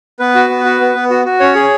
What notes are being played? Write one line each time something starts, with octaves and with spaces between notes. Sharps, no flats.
B3 B4
F#4
B3
F#4
B3
B3
F#4
F#4
C#4 C#5
G#4